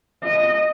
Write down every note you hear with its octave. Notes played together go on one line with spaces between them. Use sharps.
D#5